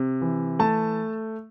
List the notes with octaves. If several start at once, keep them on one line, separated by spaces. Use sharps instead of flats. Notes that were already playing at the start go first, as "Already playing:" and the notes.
Already playing: C3
E3
A3 A5